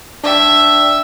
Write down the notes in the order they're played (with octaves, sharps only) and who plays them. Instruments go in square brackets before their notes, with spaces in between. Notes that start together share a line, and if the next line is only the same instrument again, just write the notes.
[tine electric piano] D4 D5 G5 [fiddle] E5